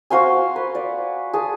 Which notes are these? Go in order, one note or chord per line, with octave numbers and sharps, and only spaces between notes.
F#4 C5 F5 G#5
B4
D5
G#4 A5